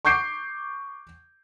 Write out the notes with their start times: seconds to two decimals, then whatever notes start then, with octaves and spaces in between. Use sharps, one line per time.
0.05 C#6 D6 G6 C7 D7